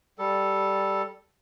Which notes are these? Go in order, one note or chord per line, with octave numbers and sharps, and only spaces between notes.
G3 A4